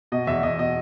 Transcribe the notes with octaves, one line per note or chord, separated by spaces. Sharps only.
B2 D#5
E2 E5
E2 D#5
B2 D#5